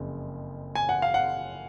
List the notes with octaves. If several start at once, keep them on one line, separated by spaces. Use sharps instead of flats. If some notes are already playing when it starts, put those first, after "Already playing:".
Already playing: F#1 F2 C#3
G#5
F#5
F5
F#5